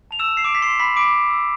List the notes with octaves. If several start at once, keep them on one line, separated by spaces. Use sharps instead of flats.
A5 F7
E6 E7
A5
C7
D6 E6 D7
B6
C6 E6 C7
B5 E6 B6
B5 D6 D7
B5
E6